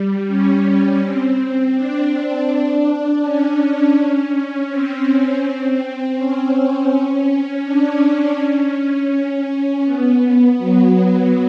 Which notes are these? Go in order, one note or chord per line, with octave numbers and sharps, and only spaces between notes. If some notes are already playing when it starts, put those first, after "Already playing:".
Already playing: G3
C#4
C4
C4
D4
C#4
C#4
C4
C#4
C#4
D4
C#4
B3
F#3